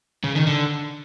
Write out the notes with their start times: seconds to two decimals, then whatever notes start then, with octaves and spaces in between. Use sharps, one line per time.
0.24 C#3
0.35 D#3
0.47 D3